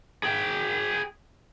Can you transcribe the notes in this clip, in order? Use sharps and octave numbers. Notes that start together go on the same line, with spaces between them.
G#4 G5